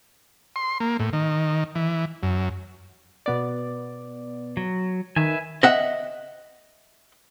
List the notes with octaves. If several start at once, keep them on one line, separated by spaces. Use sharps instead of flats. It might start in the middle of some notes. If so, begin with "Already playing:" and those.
C6
A#3
A2
D#3
E3
F#2
B2 B3 D5
F#3
D#3 B4 E5 G#5
D#5 E5 F#5